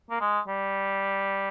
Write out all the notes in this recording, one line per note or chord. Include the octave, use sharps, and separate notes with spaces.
A#3
G#3
G3